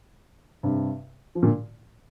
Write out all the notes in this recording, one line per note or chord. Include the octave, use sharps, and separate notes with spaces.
G2 C3
F3
A#2 D3